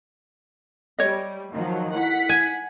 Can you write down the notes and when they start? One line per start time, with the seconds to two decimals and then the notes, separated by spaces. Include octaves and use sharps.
0.99 G3 C#5 D#5
1.52 D#3 F3 F#3
1.94 E4 F#5 B6
2.29 G#5